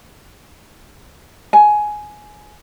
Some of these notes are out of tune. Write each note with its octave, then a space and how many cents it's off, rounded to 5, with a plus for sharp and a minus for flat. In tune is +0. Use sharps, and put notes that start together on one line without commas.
G#5 +15